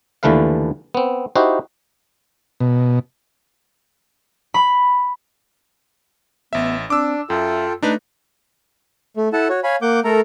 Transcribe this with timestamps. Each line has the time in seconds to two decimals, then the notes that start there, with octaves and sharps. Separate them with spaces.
0.23 D#2 D3 E3 A3 B4 F5
0.95 B3 C4
1.35 D#4 E4 F#4 G4 C5
2.60 B2
4.54 B5
6.53 A1 B3 E5
6.90 C4 D4 D6 E6
7.30 F#2 F4 A4 E5 G5
7.83 A3 D4 D#4 B4
9.17 A3
9.33 E4 A4 F#5 A5
9.49 F#4 C#5
9.64 C#5 F5 G#5 B5
9.82 A#3 F#5 D6 G6
10.04 A3 A4 A#4 A#5